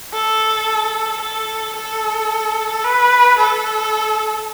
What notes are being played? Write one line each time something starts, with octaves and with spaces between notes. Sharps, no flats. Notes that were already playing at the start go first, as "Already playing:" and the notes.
A4
A4
A4
B4
A4